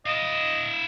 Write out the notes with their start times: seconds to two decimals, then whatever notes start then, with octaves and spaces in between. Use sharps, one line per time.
0.06 E4 D#5 F5